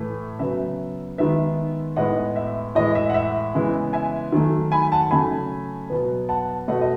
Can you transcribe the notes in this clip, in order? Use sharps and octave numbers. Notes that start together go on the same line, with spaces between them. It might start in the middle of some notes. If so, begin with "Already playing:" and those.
Already playing: A2 E3 A3
C#3 F#3 B3 E5
D#3 G#3 B3 E5
A2 G#3 B3 D#5 F#5
E5
A2 E3 G#3 D#5
E5
F#5
E5
C#3 E3 G#3 B3
E5 G#5
D#3 F#3 A3
G#5 B5
F#5 A5
C#3 F#3 A3 G#5 B5
B2 F#3 B3
F#5 A5
B2 A3 D#5 F#5
D#5